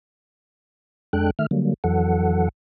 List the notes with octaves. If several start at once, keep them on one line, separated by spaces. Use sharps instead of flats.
F2 G#3 D4 A4 G5 F#6
D#3 A3 E5 F6
D3 F#3 G3 A#3
F2 E3 F#3 A4 F#5